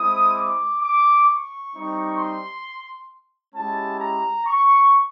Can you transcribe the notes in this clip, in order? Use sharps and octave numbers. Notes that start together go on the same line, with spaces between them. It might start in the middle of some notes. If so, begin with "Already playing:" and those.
Already playing: G#3 C4 E4 D#6
D6
D6
C#6
G3 C4 D#4
C6
G#3 C#4 E4 G4 A5
A#5
C#6